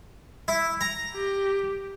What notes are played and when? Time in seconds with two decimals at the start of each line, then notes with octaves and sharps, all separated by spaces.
0.48 E4
0.81 A#5
1.15 G4